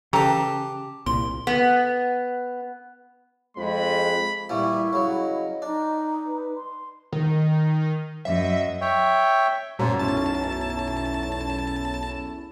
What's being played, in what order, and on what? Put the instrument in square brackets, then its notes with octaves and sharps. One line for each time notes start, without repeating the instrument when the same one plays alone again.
[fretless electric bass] C#3 [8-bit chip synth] E3 A5 [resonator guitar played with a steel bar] G4 [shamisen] A4 A#5
[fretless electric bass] C2 A#2 [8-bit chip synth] C6
[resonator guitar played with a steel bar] B3
[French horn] F2 [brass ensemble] G#3 [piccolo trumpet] B5
[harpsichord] A#2 E3 G3 [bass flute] E4 [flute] C#6
[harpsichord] C#3 F#3
[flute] D#5
[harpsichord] D4 [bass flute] D#4
[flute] B4
C6
[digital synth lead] D#3
[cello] F#2 D#5 [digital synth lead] E5
[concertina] C#5 E5 G5
[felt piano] F#2 [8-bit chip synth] A#2 [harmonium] C#3 C5 C#5
[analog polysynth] B1 C#4 E7 [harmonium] E2 A3 E4 [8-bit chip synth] A5